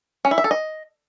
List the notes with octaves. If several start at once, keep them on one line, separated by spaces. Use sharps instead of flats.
C#4
E4
E5
A4
D#5